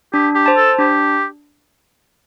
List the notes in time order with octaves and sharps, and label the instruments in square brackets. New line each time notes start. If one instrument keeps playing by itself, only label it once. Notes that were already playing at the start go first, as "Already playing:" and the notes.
[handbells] D4 [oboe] G4
[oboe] G4
[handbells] C5 A5
[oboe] A4
[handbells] D4 [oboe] G4